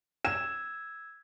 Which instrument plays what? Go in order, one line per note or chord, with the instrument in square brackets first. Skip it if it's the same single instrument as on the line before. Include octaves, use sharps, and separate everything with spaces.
[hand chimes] E6 G#6 [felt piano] E7